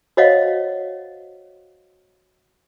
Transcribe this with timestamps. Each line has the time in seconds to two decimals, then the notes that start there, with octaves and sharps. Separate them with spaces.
0.17 F#4 C5 C#5 D#5 F5 F#5